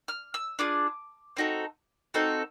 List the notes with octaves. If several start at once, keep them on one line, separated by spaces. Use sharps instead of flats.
F6
E6
D4 F4 G#4 D6
C4 D#4 F#4 A4
C4 D#4 F#4 A4